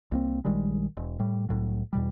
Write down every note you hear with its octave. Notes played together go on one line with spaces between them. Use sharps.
C2 A#3 C4
A#1 D#3 G3 G#3
E1
A2 G3
C2 A2 F#3
E2 B2 G3